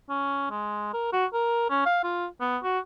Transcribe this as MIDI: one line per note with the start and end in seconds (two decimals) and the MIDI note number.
0.09 0.49 61
0.51 0.92 56
0.94 1.09 70
1.13 1.26 66
1.33 1.66 70
1.70 1.84 61
1.86 1.99 77
2.04 2.26 65
2.40 2.58 59
2.63 2.79 66